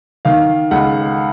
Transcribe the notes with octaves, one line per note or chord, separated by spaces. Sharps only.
D#3 F5
C#2 F#5